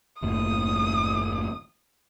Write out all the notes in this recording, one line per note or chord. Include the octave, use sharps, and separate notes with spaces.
F#1 D#2 A2 D#6